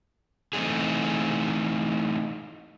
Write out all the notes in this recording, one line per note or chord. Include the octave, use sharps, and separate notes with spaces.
E3 A3 C4 D#4 G#4